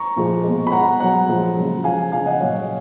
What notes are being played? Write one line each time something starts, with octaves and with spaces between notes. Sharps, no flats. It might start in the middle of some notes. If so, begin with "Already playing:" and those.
Already playing: A#5 C#6
A#2 F3 G#3
B2 G#3
B5
B2 G#3 F#5 A#5
B2 F#3 F#5 A#5
A#2 F3 G#3
C#3 F#3
C#3 F3 G#3 F5 G#5
C#3 F3 G#3 F5 G#5
D#5 F#5
A#2 F#3 C#5 F5